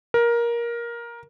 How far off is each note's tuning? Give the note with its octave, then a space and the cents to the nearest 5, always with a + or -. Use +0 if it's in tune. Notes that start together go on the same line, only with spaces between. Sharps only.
A#4 +15